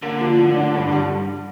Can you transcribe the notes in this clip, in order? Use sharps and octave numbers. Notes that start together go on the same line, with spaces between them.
D3 A#3
F3
A2
D4
G2
G3